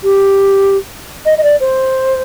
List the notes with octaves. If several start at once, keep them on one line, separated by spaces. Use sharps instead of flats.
G4
D#5
D#5
D5
C5